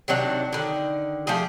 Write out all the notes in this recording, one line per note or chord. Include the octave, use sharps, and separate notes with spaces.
C3 D#3 F#3 D4
D3 D#3
F3 A3 G4 G#4